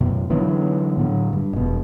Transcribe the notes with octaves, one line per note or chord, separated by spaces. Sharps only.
F#2 B2
D3 E3 F#3 B3
A2 D3 F#3
G2
F1 B2